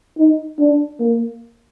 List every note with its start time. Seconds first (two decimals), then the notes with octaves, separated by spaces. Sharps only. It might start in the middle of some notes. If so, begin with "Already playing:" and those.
0.18 D#4
0.59 D4
1.00 A#3